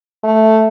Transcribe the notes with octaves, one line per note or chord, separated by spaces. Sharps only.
A3